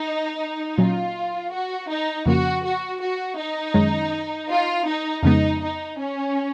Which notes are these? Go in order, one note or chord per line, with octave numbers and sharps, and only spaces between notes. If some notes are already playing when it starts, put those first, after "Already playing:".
Already playing: D#4
A#2 F#3 C#4 F4
F#4
D#4
F2 C#3 F3 A#3 C#4 F#4
F#4
F#4
D#4
F#2 D#3 G#3 C#4
F4
D#4
F2 C#3 G#3 B3 D#4
D#4
C#4